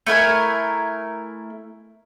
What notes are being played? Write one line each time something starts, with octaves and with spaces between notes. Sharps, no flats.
A3 E4 A#4 G#5